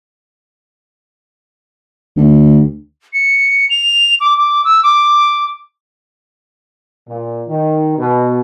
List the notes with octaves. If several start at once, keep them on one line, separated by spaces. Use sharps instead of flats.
D2
C#7
F7
D6
D6
E6
D6
A#2
D#3
B2